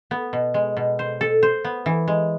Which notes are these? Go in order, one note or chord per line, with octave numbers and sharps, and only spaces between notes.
B3
B2
G#3
B2
C5
A4
C5
B3
E3
G#3